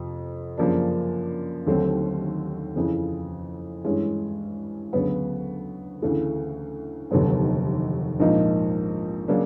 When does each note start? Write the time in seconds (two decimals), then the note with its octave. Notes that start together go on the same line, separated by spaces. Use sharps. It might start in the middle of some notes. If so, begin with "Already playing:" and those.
Already playing: F2 C3 F3
0.58 F#2 C#3 F3 A#3 D4
1.67 D#2 D3 F#3 A3 C4
2.76 F2 C#3 E3
3.85 G2 E3 G#3 C#4
4.93 D2 C#3 F#3 B3
6.02 D2 C#3 E3 A3
7.11 F1 D#2 D3 F#3 B3
8.20 A#1 G#2 F3 A#3 D#4
9.28 C#3 F#3 A#3 D4